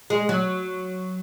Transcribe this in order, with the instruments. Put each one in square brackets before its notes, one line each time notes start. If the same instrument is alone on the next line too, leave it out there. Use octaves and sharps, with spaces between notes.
[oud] G#3
F#3